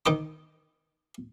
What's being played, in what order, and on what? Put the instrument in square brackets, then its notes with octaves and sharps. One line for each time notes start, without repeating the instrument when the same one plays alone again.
[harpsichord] D#3 D#4 D6